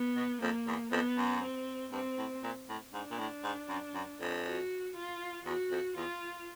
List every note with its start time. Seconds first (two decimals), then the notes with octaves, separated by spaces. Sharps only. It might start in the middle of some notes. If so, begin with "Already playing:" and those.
Already playing: B3
0.16 B2
0.42 F2 A#3
0.67 E2
0.92 F2 B3
1.17 F#2
1.42 C4
1.92 G2 C4
2.18 A2
2.43 A#2
2.69 A2
2.94 G#2 D4
3.11 A#2
3.18 A2
3.44 G#2
3.69 F#2
3.95 F#2
4.21 F2
4.45 F#4
4.96 F4
5.46 E2 F#4
5.71 F2
5.97 E2 F4